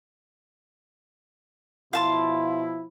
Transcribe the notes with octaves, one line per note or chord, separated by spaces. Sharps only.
B2 F3 E4 F5 A5 C6